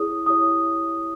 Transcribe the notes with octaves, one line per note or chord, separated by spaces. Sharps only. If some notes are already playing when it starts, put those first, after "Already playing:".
Already playing: E4 G#4 C#5 D#6
E4 G4 C#5 D#6